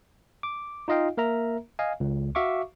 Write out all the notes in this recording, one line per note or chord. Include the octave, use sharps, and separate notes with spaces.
D6
D#4 F4 D#5 F5 G5
A#3 A#4 E5 A#5
D#5 F5 G#5
C#2
F#4 E5 F5 C#6 D6